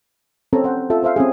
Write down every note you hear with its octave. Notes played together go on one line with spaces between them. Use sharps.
C4 C#4 A4 C#5 A#5
C5 F#5
F4 A4 E5
A4 C5 E5 F5
C4 C#4 G#4